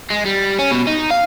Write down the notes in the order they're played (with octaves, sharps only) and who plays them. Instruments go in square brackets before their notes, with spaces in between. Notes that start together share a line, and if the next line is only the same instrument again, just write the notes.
[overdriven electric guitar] G#3
G3
C#4
B2
D#4
F5